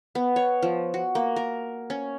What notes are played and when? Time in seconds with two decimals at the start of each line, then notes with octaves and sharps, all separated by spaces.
0.15 B3
0.36 C#5
0.63 F3
0.94 F#4
1.15 A#3
1.36 A#4
1.90 C#4